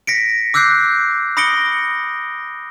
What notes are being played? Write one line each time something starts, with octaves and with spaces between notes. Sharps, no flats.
A#6 B6 C#7 D7
D6 E6 F#6 G6 C7
B5 D#6 A#6 C#7 D7 G7